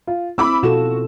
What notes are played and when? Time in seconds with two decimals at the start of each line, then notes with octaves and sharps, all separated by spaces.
0.07 F4
0.38 C4 E4 B5 D6 E6
0.63 B2 F4 F#4 A4 E7